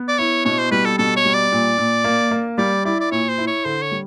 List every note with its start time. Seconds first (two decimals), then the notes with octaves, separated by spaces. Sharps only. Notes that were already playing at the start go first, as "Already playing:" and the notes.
Already playing: B3
0.08 D5
0.19 E4 C#5
0.45 B2 C#5
0.59 C5
0.71 G3 B4
0.85 A4
0.98 B2 A4
1.17 C#5
1.25 G3
1.34 D5
1.52 A#2
1.78 A#2
2.04 A#3
2.31 A#3
2.58 G3 D5
2.85 E4 D5
3.00 D5
3.12 A#2 C#5
3.29 C5
3.38 E4
3.47 C#5
3.65 D3 C5
3.82 C#5
3.91 G3